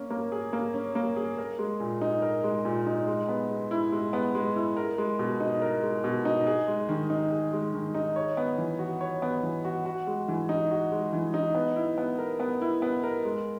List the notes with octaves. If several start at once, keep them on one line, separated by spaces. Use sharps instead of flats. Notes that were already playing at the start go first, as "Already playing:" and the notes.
Already playing: A#3 C#4
A#3
G#4
A#3
C#4
A#3
G#4
A#4
G#3
A#2
D#4
A#4
G#3
A#2
D#4
G#3
B3
G#3
E4
G#3
B3
G#3
E4
A#4
G#3
B2
D#4
A#4
G#3
B2
D#4
G#4
G#3
D#3
D#4
G#4
G#3
D#3
D#4
C#5
B3
E3
F#4
C#5
B3
E3
F#4
F#4
G#3
E3
D#4
F#4
G#3
E3
D#4
B3
E4
B3
A#4
B3
E4
B3
A#4
G#3